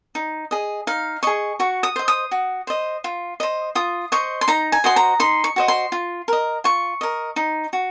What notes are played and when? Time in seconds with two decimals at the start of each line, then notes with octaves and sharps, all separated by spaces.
0.15 D#4
0.51 G#4 D#5
0.87 D#4 F5
1.23 G#4 D#5 C#6
1.59 F#4 C#6
1.83 D#6
1.96 C5 D#5
2.08 D#6
2.31 F#4
2.67 C5 D#5
3.04 F4
3.40 C5 D#5
3.75 F4 D#6
4.12 C5 D#5 C#6
4.41 C6
4.48 D#4 A#5
4.72 G#5
4.84 F#4 C5 D#5 C6
4.96 A#5
5.20 D#4 C6
5.44 C#6
5.56 F#4 C5 D#5
5.68 C6
5.92 F4
6.28 A#4 D#5
6.64 F4 C#6
7.01 A#4 D#5
7.36 D#4
7.73 F#4